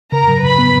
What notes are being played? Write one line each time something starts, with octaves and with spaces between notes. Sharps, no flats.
C#3 A#4 A#5
F#3
C#3 B4 B5
B3